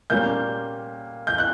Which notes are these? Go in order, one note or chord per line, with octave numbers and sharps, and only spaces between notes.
A#2 G3 A#3 C#4 G6
G6
F#6